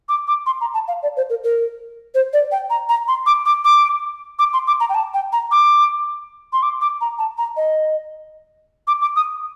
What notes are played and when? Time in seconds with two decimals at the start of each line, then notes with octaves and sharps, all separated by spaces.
0.09 D6
0.28 D6
0.46 C6
0.61 A#5
0.74 A5
0.88 F5
1.02 D5
1.17 C5
1.30 A#4
1.44 A#4
2.14 C5
2.33 D5
2.52 G5
2.70 A#5
2.89 A#5
3.08 C6
3.26 D6
3.45 D6
3.65 D6
4.39 D6
4.53 C6
4.67 D6
4.80 A#5
4.89 G5
4.95 A5
5.14 G5
5.32 A#5
5.51 D6
6.53 C6
6.63 D6
6.81 D6
7.01 A#5
7.18 A5
7.38 A#5
7.57 D#5
8.87 D6
9.01 D6
9.16 D#6